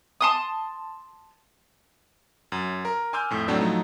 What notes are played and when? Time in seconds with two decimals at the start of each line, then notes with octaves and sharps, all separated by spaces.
0.21 A5 C6 D#6
2.52 F#2
2.85 A#4
3.13 G#5 C6 D6 E6 F6 G6
3.30 F2 A2
3.48 A2 F#3 A3 C4 D4
3.60 F3 F#3 A3 D#4